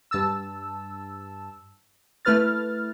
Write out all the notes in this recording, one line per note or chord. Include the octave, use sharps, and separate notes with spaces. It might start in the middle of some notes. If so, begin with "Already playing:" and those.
G2 A5 E6
A3 E4 B4 F6 A6